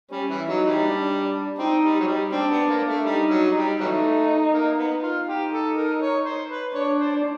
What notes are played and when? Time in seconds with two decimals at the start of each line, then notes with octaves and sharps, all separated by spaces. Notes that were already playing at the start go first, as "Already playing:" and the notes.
0.11 G3 C#4
0.29 E3
0.48 F#3 D#4
0.66 E3 G3
0.85 D4
1.59 C4 D#4
1.84 G3
2.00 F#3
2.07 G3
2.32 C4 D4
2.51 B3
2.69 A#3
2.88 A3
3.06 G3 D#4
3.30 F#3
3.56 G3
3.80 E3 F#3 A3 D#4
4.53 A#3
4.78 B3
5.03 F4
5.27 D#4 G4
5.52 A4
5.77 A#4
6.01 C#5
6.25 C5
6.49 B4
6.74 D4 C#5
6.98 C5